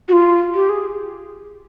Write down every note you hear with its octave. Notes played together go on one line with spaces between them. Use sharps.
F#4
F4
G4
G#4